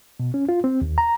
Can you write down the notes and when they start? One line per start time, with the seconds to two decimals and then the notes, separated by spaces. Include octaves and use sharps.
0.20 B2
0.34 C#4
0.49 F4
0.64 C4
0.82 D#2
0.98 A#5